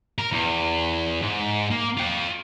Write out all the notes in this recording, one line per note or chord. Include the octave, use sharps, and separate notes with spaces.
A#4
E2
G#2
A#3
F4 G5